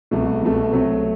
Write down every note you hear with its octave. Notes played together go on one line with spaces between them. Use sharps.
C2 B2 A3
C2 B2 A3
C3 F#3 A3